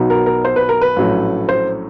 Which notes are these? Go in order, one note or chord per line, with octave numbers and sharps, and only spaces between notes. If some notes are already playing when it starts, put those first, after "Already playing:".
Already playing: B1 B2 F#3 B3 D#4
A#4
A#4
C5
B4
A#4
B4
A#1 A2 F#3 A3 C#4
C5